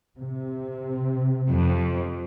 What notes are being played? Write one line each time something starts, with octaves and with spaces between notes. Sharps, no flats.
C3
F2